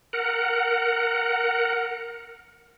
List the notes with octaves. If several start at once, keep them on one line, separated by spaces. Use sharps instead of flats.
A#4 F#5